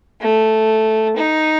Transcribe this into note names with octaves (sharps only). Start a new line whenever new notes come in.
A3
D#4